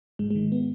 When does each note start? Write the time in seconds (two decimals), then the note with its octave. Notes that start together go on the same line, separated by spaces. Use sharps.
0.19 G#2 G#3
0.31 G#3
0.35 D#3
0.52 B3